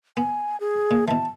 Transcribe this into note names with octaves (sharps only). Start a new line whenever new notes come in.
B3 G#5
G#4
A#2
B2 E3 A5